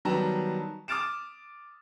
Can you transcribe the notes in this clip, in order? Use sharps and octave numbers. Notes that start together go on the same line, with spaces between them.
D#3 F#3 G3 B3 A5 A#5
D6 D#6 F6 A6 D7 E7